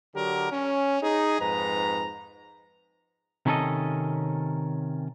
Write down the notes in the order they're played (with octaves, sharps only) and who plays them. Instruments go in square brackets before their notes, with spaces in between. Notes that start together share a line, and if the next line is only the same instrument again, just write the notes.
[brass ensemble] D3 F#3 G4 A#4
C#4
D#4 G#4
F2 G#2 B4 A#5
[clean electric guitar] C3 D#3 C#4 F4 A4 D#5